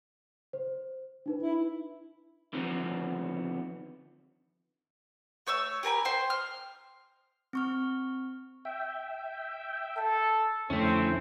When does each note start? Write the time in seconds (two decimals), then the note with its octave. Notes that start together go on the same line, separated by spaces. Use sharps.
0.53 C5
1.26 D4 D#4 B4
1.42 E4
2.53 D3 D#3 F3 B3 C4
5.47 A3 C#5 C#6 E6
5.83 G4 A#4 G#5 B5
6.05 C5 G5 C6
6.30 F6
7.53 C4 C#6 F6
8.65 E5 G5
9.97 A4
10.70 F2 D3 A3 C4 C#4 E4